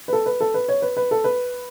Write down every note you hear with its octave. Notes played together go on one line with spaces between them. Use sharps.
B4
A4
B4
A4
B4
C#5
B4
B4
A4
B4